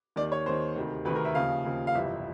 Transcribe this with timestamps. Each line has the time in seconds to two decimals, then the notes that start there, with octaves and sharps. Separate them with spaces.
0.16 D#2 D#3 D5
0.32 C#5
0.46 D#2 D#3 C5
0.76 D2 C3 D#3
1.05 D2 C3 D#3 B4
1.16 A#4
1.25 E5
1.35 D#2 C#3 F3 F5
1.65 D#2 C#3 F3
1.87 F5
1.95 G1 F2 C3 E3 E5